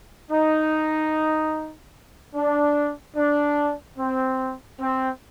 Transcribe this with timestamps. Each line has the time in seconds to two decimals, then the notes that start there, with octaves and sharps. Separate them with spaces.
0.31 D#4
2.35 D4
3.17 D4
3.98 C4
4.81 C4